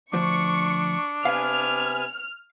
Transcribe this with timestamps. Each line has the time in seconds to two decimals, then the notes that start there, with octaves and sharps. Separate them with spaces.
0.13 D2 F3 D4 C#6
1.25 C3 B3 F5 G#5 F6